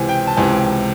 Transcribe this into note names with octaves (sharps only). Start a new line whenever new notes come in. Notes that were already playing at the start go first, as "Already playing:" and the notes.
Already playing: C#2 C3 E3 G#5
G5
A5
C#2 C3 E3 G#5